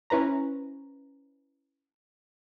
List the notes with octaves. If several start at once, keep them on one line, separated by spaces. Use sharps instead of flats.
C#4 E4 B4 C5 A#5